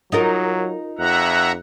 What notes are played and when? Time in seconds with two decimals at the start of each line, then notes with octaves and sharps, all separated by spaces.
0.12 F#3 D#4 F4 A#4
0.99 F2 E5 F#5 A#5 F#6